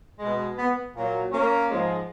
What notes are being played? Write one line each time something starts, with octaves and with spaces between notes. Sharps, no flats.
B2 G#3
B3
A#2 F#3
A#3 C#4
G#2 F3 G#3